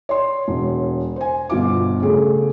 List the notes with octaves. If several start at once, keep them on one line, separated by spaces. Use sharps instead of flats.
C#5 C6
E1
C5 G#5
G1 B2 F4 D6
C#3 A3 G#4